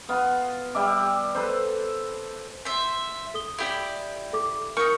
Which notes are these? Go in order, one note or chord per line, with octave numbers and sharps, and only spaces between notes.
B3 F4
G3 E5 D6
A4 B4 C5
C5 E5
A4 D#6 G7
E4 G4 D5
A4 D6
D#4 A#4 C#6 F6 G6